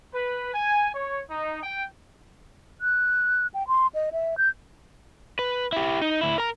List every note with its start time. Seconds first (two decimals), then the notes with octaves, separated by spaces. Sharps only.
0.12 B4
0.53 G#5
0.93 C#5
1.29 D#4
1.62 G5
2.81 F#6
3.54 G5
3.68 C6
3.94 D#5
4.12 E5
4.38 G6
5.39 B4
5.73 E4 G4
6.02 D#4
6.21 D2 E4
6.38 A#4 A#5